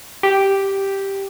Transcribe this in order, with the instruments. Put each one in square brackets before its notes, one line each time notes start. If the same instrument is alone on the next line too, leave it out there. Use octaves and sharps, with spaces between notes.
[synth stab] G4